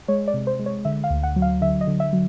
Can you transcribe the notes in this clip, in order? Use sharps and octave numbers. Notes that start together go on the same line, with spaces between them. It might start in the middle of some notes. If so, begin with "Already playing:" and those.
G#3 C#5
D5
C3
C5
G#3
C#5
D3 E5
F5
D2
F#5
F#3
F5
D3 E5
D#5
D3
E5
F#3